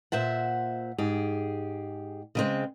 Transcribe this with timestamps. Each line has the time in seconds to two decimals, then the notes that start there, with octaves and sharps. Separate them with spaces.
0.12 A#2 C5 E5 F#5
0.98 G#2 G4 G#4
2.35 C#3 G#3 C4